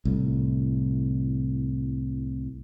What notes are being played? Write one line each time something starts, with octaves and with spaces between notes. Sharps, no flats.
C2 A2